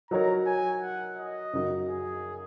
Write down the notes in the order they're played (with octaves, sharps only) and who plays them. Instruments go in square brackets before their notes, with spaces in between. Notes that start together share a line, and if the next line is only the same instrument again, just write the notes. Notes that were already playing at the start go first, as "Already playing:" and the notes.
[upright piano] F#3 D#4 A#4 C#5 [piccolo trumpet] A#5
[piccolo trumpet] G#5
F#5
D#5
[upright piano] F#2 C#3 F#3 D#4
[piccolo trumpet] G#4